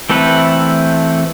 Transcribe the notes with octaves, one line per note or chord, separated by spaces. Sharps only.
E3 A3 C4 A4 B4